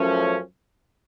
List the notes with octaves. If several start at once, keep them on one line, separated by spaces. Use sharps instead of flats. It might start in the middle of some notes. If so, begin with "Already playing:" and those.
Already playing: F#2 F3 A3 C#4